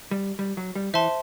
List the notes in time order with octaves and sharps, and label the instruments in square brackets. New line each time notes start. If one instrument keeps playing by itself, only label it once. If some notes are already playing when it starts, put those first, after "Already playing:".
[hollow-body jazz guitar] G3
G3
F#3
G3
[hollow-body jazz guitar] E3 [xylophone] C5 E5 A5 C6